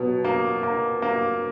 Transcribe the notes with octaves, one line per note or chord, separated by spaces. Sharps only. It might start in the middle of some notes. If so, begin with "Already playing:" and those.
Already playing: B2 F#3
A#3
A#3
A#3